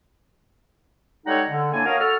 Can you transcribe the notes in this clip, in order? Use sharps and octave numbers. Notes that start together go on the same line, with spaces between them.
G3 G#3 D#4 A4 C#5 F#5
D3
A2 A#3 D4 G#5
F#4 A#4 C#5 D#5 F5
F#4 A4 F6